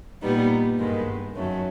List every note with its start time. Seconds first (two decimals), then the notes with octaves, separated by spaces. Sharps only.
0.21 A#2 G3 B3 D#4
0.78 G2 D#3 G#3 B3
1.35 F#2 D#3 F#3 A3 C#4